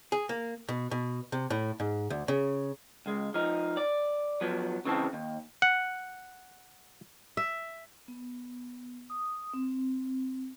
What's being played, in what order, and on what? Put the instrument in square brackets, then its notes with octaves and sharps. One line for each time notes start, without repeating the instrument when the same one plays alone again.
[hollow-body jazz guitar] G#4
A#3
B2
B2
C3
A2
G#2
D2
C#3
[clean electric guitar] C#2 G#3
F3 D#4
D5
F3 F#3 B3
C#3 E3 C4 A5
D#2
[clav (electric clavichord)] F#5
[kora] E5
[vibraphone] B3
D#6
C4